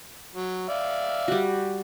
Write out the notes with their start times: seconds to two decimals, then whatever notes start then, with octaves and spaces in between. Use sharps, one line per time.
0.35 F#3
0.69 D5 E5 F5
1.28 G3 F#4